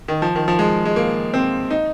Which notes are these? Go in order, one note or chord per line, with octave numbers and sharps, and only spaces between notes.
D#3
F3
D#3
F3
G#3
G#3
A#3
C4
D#4